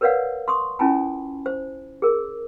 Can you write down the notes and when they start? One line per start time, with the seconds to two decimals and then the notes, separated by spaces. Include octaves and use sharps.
0.01 A#4 B4 C#5 D5 F5 F#5
0.48 C6 C#6 D#6
0.79 C#4 E4 F4 G#5 A5 B5
1.46 C5
2.02 G#4 A#4